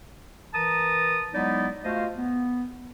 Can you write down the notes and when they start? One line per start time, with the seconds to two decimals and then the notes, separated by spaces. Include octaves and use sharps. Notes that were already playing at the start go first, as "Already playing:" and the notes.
0.54 E3 A#4 B4 A5 A#5 D#6
1.34 F#3 G#3 B3 D#4 E4 D5
1.84 A3 F4 F#4 C5 D#5 F5
2.17 B3